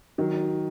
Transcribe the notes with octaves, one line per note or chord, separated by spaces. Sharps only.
D#3 F#3